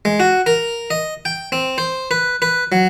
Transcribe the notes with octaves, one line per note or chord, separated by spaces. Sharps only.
G#3
F#4
A#4
D#5
G5
C4
C5
B4
B4
F#3